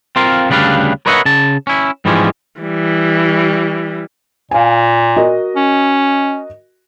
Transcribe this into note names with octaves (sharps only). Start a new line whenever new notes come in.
C4 F4 A#4 F5
D2 C#3 G3 D4 B4 F5
A#4 B4 C#5 D#5 E5 F#5
C#3 A5
C#4 E4
G#2 E3 F3 G3 G#3 C#4
E3 G3
A#2 F5 G#5
F#4 A#4 D#5
C#4